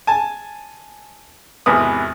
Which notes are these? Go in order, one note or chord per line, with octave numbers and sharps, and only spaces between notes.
G#5 A5
G#1 E2 C3 B4 D#6